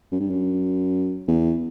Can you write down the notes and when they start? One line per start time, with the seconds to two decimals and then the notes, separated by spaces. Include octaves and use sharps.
0.11 F#2
0.20 G2
0.30 F#2
1.28 E2